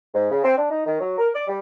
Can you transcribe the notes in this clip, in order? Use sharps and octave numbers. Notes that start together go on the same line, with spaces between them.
G#2
C#3
C4
D4
D#4
D#3
F#3
A#4
D5
G3